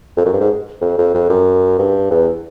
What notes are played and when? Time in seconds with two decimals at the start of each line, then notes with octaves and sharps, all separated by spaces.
0.17 F2
0.25 F#2
0.33 G2
0.40 G#2
0.81 F2
0.98 F2
1.14 F2
1.29 F#2
1.79 G2
2.11 E2